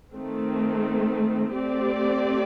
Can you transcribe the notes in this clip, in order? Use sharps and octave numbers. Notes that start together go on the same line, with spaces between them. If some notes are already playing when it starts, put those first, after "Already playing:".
D#3 A3 C4
A3 C4 G4 D5